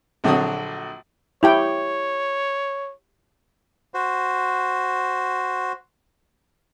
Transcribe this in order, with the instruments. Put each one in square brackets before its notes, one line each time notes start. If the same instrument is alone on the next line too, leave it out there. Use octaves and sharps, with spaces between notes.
[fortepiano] A#1 D3 F#3 C4 F#4 D#6
[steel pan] E4 G4 G5 [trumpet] C#5
[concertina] F#4 C5